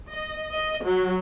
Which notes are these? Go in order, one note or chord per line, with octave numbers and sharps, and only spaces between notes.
D#5
D#5
F#3